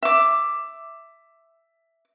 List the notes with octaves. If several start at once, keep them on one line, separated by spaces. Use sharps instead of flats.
E5 D6